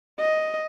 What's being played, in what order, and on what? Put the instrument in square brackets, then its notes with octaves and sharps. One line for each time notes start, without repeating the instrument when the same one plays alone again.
[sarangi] D#5